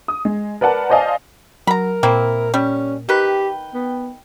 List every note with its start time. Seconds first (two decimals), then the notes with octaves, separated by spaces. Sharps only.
0.08 D#6
0.25 G#3
0.61 A#4 B4 D5 F#5 A5
0.90 C5 D5 D#5 F5 G#5 A5
1.67 F#3 A#4 A#5 B5
2.03 A#2 A#3 C4 E4
2.54 G3 C#4
3.09 D#3 G4 B4 G5
3.74 B3